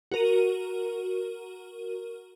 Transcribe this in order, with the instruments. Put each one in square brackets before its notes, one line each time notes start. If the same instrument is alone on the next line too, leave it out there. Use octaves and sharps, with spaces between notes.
[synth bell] F#4 A#4 D#7